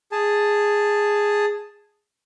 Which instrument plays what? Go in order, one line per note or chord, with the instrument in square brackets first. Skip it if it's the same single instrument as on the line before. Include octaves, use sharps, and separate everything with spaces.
[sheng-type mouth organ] G#4 A5